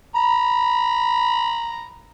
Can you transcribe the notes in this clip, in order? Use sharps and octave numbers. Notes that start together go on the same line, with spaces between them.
A#5 B5